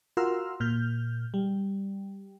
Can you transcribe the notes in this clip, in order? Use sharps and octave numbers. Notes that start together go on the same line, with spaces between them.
F4 F#4 A#4 C6 E6 F6
A#2 F6 G6
G3